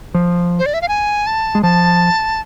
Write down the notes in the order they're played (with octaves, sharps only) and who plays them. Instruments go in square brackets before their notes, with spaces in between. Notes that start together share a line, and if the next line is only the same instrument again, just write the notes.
[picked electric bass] F3
[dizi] C5
D5
E5
F5
G#5
A5
[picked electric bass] G#3
[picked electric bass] F3 [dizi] A5